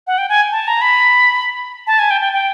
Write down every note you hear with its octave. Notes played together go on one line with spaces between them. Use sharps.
F#5
G5
G#5
A5
A#5
B5
A5
G#5
G5
G5
G5